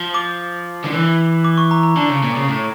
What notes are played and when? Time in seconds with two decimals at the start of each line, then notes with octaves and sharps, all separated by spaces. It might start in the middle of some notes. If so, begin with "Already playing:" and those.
Already playing: F3
0.14 D6
0.84 D3
0.93 E3
1.45 D6
1.58 C#6
1.71 A#5
1.83 A#5
1.97 D3 A5
2.10 C#3
2.23 A#2
2.36 C#3
2.49 A2